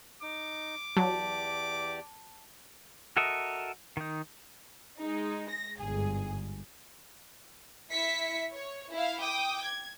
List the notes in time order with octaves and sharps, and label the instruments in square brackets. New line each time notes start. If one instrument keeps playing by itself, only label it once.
[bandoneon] D#4 [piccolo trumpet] D6
[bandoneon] E2 G4 D5 [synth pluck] F#3 [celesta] A5
[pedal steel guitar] F#4 A4 A#4 D#5 E5
D#3 D#4
[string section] G#3 D#4
A#6
G1 G#2 G#4
[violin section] E4 E5 B6 C#7
C#5
E4 F5
G5 D6 D#6
G#6